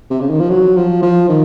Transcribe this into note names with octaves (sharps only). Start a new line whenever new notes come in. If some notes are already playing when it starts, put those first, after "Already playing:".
C3
C#3
D#3
F3
F#3
F3
F3
D#3